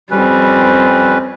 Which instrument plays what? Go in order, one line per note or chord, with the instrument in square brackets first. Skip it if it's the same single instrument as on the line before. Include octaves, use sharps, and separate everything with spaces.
[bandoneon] F2 C#4 B4 [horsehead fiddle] G3 C4